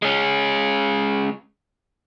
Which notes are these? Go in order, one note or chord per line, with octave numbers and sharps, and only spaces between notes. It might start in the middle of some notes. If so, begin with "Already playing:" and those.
G#3 C#4